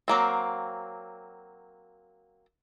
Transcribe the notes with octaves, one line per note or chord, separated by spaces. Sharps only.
F#3 A#3 C4